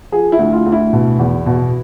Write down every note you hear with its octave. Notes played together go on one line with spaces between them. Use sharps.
F3 G#4
E4
D2
F4
D2
E4
B2
E2
B2